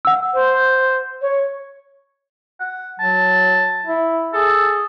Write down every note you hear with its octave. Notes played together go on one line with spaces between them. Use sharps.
F#5 E6
C5
C#5
F#5
F#3 A5
E4
G#4 A4